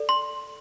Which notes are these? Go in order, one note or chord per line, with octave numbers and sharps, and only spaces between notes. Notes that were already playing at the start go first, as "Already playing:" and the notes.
Already playing: A4 D5
C6